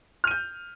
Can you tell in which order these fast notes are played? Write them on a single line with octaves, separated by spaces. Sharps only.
F6 D#7 G6